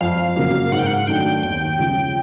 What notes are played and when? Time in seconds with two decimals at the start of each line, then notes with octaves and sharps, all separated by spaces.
0.01 F2 F5
0.36 C#3 F#3 A#3
0.72 G#2 F#5
0.79 G5
0.86 F#5
1.07 D#3 F#3 A3 D4 G5
1.43 D#2 G5
1.79 C#3 F3